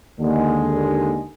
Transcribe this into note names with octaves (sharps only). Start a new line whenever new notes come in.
D#2 D3 G#3